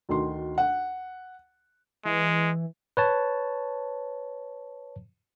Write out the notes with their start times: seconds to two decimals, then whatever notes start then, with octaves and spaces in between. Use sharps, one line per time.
0.09 D2 D#3 F#4 C6
0.58 F#5
2.05 E3 G#3
2.97 B4 C#5 A5